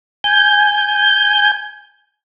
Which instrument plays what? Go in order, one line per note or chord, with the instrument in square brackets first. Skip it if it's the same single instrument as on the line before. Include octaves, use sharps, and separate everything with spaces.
[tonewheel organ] G#5 G6